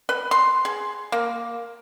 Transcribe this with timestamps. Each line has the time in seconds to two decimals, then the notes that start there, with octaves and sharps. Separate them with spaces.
0.09 B4
0.31 C6
0.65 G#4
1.12 A#3